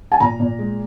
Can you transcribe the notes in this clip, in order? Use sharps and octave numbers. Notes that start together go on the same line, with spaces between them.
G#5
A#2 A#5
A#2
G#3